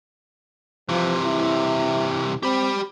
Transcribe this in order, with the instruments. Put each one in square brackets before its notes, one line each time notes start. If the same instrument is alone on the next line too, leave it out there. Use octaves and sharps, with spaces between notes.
[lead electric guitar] C3 E3 [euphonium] F3
[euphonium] E4
[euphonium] C4 [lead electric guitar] G4 B5